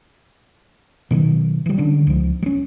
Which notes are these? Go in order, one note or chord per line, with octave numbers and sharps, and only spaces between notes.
B2 D#3 E3 F#3
E3 G3
D3 C#4 D4
C#2 F3
G3 C#4